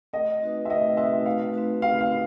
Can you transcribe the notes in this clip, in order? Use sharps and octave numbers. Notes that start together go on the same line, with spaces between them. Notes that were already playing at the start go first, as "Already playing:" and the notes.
A3 D#5
C4 D#4 F#4 B4
E5
A3 D#5
C4 D#4 F#4 B4 E5
A3 F5
C4 D#4 F#4 B4
A3 F5
F5
C4 D#4